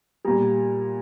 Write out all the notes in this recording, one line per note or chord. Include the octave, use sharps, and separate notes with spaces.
A#2 G3 A#5